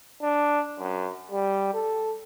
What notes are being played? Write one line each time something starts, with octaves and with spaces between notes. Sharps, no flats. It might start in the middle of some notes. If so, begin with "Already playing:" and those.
D4
F#2
G3
A4